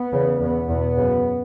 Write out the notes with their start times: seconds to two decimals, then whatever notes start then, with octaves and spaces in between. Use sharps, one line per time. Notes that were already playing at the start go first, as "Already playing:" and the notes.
Already playing: B3
0.12 E2 C#3
0.40 E2 B2 B3
0.69 E2 B2
0.97 F#2 C#3